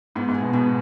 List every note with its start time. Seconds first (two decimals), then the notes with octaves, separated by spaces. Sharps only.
0.16 G#2 B3
0.28 G#2
0.34 G#4
0.41 B2
0.53 G#2 B2